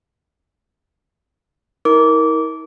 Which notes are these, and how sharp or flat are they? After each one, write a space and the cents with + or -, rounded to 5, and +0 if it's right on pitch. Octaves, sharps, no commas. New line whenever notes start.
E4 -45 A#4 +0 D6 -20